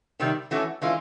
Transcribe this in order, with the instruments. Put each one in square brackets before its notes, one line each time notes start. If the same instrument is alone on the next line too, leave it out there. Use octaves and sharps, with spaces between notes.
[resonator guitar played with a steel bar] C3 D#3 G3 C4
E3 A3 C#4 F#4
E3 G#3 C#4 F4